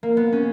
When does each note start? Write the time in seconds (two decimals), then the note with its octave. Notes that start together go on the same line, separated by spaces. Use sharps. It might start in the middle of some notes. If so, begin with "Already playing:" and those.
0.03 A#3
0.17 B3
0.32 C#4